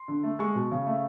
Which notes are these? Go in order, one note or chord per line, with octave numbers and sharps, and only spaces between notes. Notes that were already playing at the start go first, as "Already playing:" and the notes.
Already playing: C6
D3
A3
G#3 C#6
B2
C#3
A3